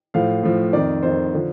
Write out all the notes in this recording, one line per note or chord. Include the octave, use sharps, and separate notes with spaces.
A2 F3 F5
A2 F3
F2 D#3 D5
F2 D#3 C5
D3 F3